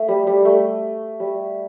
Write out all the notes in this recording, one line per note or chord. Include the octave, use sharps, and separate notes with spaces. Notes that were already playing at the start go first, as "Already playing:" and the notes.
Already playing: A3
G3
G3
A3
G3